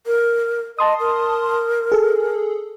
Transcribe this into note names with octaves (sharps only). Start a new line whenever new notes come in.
A#4
D#5 A5 C6 D#6
A#4
G#4 A4